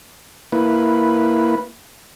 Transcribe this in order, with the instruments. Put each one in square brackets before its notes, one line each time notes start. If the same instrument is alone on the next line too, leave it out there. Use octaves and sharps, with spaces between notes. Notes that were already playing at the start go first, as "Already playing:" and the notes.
[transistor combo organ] A#3 E4 B4